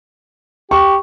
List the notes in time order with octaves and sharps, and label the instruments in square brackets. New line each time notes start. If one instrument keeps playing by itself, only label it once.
[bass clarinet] G4 [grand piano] C#6